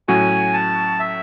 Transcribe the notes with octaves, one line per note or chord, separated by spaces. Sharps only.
A2 F#3 C#4 F#4 G#5
A5
E5